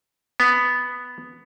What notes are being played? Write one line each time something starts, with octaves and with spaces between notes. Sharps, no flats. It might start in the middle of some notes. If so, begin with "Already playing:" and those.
B3